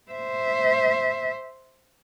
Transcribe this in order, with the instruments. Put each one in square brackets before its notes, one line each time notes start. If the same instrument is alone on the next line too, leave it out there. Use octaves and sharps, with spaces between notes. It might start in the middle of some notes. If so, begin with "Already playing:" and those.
[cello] C5 E5